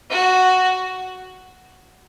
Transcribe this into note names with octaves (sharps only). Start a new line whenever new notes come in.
F#4